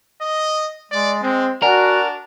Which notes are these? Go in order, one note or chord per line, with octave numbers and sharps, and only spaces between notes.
D#5
G#3 D5
G#3 C4
D4 F#4 A#4 D5 F#5 G#5